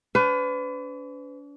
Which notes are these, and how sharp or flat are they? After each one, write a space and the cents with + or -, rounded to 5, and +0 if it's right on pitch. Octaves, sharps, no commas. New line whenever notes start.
D4 -45 B4 +35